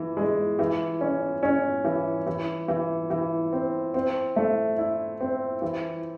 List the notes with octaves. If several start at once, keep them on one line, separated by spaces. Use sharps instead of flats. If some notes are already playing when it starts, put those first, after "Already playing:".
Already playing: E3
G#3
E3
C#4
C#4
E3
E3
E3
E3
C4
C4
A3
E4
C4
E3